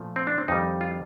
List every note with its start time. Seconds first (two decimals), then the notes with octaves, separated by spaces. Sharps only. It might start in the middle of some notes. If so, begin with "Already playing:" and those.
Already playing: A#2 F3 A3
0.16 C4
0.27 D4
0.38 C4
0.48 F2 D#3 G3 D#4
0.81 F4